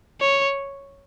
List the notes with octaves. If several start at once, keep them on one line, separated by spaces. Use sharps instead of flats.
C#5